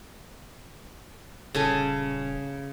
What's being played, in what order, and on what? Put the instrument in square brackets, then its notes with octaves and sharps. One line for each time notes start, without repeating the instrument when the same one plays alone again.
[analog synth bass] D#1 [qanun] C#3 A4 G#5